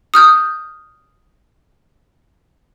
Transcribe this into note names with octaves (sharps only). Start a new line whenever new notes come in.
D#6 F6 G6